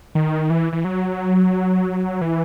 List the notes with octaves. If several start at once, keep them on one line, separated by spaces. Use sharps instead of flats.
D#3
E3
E3
F#3
E3